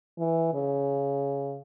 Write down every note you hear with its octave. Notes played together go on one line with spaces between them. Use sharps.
E3
C#3